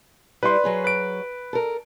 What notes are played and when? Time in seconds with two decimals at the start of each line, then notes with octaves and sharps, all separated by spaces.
0.43 G3 E4 G4 B4 C6
0.64 F#3 G#4 C#5
0.84 B4 D7
1.53 A4 A#4